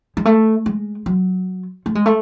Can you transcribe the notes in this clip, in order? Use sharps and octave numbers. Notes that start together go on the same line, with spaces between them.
G#3
A3
G#3
F#3
A3
G#3
A3